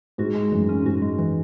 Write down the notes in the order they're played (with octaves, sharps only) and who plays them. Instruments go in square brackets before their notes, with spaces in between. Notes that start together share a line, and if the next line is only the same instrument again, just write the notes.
[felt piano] G#2 [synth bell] F#4
[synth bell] G#3
[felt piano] F#2 [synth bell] E3
[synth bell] C#4
[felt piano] G#2 [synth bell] F#4
[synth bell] G#3
E3